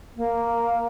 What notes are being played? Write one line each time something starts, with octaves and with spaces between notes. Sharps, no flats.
A#3